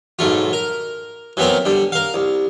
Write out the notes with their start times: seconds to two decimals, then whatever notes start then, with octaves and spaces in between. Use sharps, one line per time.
0.19 B1 G#2 A3 F4
0.53 A#4
1.37 E3 F#3 B3 C4 A#4
1.65 D3 G3
1.92 A#4 F5
2.14 C2